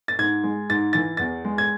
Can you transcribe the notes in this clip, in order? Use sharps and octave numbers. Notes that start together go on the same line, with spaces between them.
A6
G#2 G#6
G#3
G#2 A6
E3 A6
E2 A6
G#3
G#6